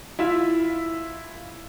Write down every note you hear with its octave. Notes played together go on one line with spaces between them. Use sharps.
E4 F4 E5